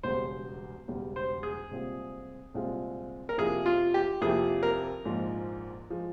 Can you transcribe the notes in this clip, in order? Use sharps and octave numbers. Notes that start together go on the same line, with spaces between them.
E1 E2 C#3 G3 C5
E1 E2 C#3 G3
C5
G#4
C2 A#2 G#3 C4 F4
C2 A#2 G#3 C4 F4
A#4
F2 C3 F3 A#3 E4 G#4
F4
G4
F2 C3 F3 A#3 E4 G#4
A#4
A#1 G#2 F3 G#3
F3 G#3